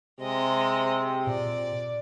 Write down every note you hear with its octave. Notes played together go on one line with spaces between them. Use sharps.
C3 G#3 D#5
A#2 D5